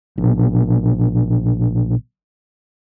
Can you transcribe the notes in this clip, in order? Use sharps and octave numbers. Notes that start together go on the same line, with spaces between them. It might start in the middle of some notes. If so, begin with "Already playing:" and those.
A#1 B2